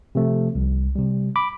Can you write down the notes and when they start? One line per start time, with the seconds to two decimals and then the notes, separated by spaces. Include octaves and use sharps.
0.15 C3 F3 A3
0.55 C2
0.96 C3 G3
1.36 B5 D6